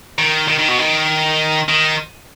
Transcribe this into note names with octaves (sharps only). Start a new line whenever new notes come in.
D#3
D#3
D#3
B2
D#3
D#3